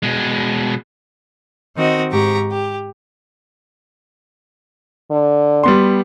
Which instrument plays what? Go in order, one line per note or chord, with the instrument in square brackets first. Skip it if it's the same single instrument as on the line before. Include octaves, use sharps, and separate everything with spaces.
[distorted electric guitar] B2 G#3
[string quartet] D#3 C4 F#4 D#5
G#2 G4 A#5 C#6
G4
[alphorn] D3
[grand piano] G3 B3 C6